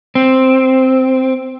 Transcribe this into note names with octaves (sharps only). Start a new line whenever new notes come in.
C4